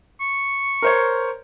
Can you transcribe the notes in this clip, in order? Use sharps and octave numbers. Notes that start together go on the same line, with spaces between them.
C#6
A#4 C5 C#5